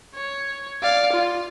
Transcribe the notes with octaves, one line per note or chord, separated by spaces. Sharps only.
C#5
D5 F5
F4